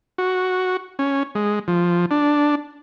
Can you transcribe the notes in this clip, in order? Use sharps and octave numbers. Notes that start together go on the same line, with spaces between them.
F#4
C#4
G#3
F3
D4